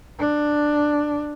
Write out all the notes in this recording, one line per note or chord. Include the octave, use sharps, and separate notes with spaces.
D4